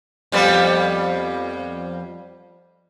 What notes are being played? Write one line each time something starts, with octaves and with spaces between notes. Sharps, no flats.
F2 G3 B3